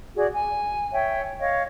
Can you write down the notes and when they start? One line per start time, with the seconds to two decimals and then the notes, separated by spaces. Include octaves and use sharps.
0.15 F#4 G#4 D5
0.32 G#5
0.92 C#5 E5 G5
1.40 C#5 D#5 F5